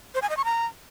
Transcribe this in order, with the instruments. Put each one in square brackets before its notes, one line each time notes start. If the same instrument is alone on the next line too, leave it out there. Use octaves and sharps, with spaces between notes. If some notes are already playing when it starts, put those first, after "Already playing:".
[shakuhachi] C5
G#5
D#5
C#6
A#5